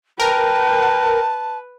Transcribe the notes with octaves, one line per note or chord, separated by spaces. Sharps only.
A#4 B4 G5 A5